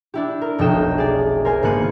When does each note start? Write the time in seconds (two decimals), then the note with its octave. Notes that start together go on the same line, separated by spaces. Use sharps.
0.14 D4 E4 G4
0.41 A#4
0.58 F1 B1 D#5 G5 E7
0.98 G#4 D5
1.45 A#4 C5 G#5
1.63 G#1 A#3 B3 F#6 C#7 D#7